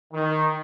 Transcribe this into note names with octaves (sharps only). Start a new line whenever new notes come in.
D#3